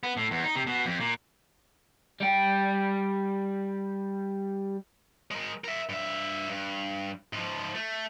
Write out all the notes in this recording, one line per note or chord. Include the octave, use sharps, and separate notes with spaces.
B3
A2
E2
D#4
C3
B2
F2
A#2
G3 G5
G#3 A#4
A#4 E5
G2 E5
G2
G#2 F3
A3